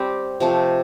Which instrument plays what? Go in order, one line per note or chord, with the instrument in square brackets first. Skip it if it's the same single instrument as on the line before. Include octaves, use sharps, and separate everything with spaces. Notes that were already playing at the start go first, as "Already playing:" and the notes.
Already playing: [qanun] G3 C4 G4
C3 F3 A3